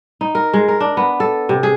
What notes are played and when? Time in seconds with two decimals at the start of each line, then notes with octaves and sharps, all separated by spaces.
0.21 D#4
0.35 A#4
0.54 G#3
0.68 A#4
0.80 D4
0.97 B3
1.20 A4
1.49 C3
1.63 G#4